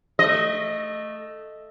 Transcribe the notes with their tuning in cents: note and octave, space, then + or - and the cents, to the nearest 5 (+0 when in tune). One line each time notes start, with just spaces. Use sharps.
A3 +0 D#5 -10